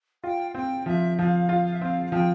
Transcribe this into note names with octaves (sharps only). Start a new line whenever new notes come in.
F4 G5
F5
C4 G5
F3 E5
F3 F5
F4
F5
E5
C4 F5
F5
F3 G5